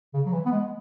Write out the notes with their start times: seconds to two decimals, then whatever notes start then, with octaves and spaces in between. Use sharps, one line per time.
0.14 C#3
0.26 F#3
0.32 E3
0.46 B3
0.52 G#3